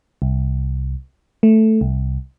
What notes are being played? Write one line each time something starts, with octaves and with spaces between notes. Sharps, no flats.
C2
A3
C2